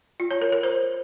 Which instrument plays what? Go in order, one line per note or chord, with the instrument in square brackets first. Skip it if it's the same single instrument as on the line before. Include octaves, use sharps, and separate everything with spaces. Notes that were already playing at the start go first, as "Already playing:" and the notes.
[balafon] F4
C#5
A#4
A#4
C5